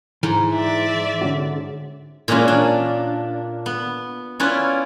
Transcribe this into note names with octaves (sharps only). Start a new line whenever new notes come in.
G#2 E3
D5 E5
D3 C#4 F#4
A#2 E3 G#3 A#3 C#4 A#5
D4
B3
C#4 E4 F4 B4 D5 F#5